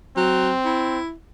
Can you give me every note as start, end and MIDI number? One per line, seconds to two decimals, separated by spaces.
0.17 0.54 54
0.17 0.99 60
0.65 1.12 64